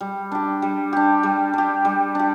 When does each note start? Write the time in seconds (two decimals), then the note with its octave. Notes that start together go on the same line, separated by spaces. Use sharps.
0.01 G3
0.32 D4 G4
0.62 G3
0.93 D4 G4
1.23 G3
1.54 D4 G4
1.85 G3
2.15 D4 G4